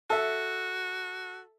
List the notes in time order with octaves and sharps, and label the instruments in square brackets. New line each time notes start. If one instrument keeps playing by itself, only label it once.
[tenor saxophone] F#4 [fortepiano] A4 E5